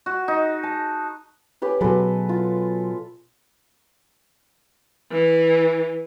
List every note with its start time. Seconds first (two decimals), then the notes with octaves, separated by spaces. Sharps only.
0.06 F#4
0.28 D#4
0.63 A5
1.62 C#4 G4 B4
1.81 B2 F#3 G#3 A4 B4
2.29 F4
5.11 E3